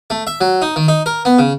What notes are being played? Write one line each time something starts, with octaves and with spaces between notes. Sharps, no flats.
A3
E5
F#3
D#4
D#3
D#4
A#4
B3
C#3